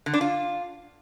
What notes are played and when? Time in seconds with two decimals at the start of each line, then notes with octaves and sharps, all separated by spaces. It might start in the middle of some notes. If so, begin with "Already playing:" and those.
0.06 D3
0.14 D4
0.21 F4